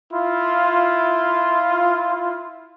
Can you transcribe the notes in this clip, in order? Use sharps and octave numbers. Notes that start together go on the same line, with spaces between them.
E4 F4